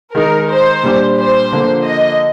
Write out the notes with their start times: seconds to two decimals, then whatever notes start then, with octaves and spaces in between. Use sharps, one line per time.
0.15 D#3 G#3 D#4 A#4
0.49 C5
0.83 A#2 G3 D4 G4
1.18 C5
1.52 D3 F3 A#3
1.86 D#5